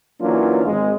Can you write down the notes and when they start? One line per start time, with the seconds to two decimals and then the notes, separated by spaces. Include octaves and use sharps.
0.21 E3 F#3 A#3 C#4 D4 F4
0.66 G#1 G#3